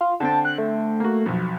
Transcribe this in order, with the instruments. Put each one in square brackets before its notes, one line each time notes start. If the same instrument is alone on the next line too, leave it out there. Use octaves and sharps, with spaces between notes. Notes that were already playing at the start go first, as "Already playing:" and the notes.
[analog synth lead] F4
[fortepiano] D3 C4 G5 [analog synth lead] A5
[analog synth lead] F#6
A3
[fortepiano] A#3 F#4
B1 F2